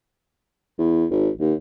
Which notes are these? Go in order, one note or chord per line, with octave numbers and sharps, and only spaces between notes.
E2
G#1
D#2